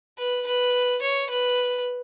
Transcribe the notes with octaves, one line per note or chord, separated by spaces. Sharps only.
B4
B4
C#5
B4